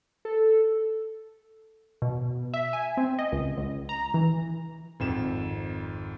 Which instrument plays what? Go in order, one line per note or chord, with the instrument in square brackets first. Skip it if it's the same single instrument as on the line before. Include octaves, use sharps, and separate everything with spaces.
[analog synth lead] A4
[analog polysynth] B2
E5
G#5
C4
D#5
C#2
C#2
A#5
E3
[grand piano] G#1 F2 E7